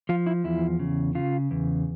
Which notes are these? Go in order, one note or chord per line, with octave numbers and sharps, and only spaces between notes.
F3 F4
E4
E2 E4
C#3
C#3 F4
E2